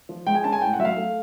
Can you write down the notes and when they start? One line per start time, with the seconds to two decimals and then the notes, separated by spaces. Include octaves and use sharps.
0.09 F3
0.27 G#3 G5
0.35 G#5
0.44 C#4 A5
0.52 G#5
0.61 A2 G5
0.73 F#5
0.79 F#3 E5
0.85 F5
0.97 A3